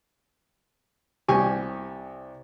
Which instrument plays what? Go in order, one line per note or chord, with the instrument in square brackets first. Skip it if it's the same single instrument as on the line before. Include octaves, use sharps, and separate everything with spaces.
[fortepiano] C2 G4 G#5 C#6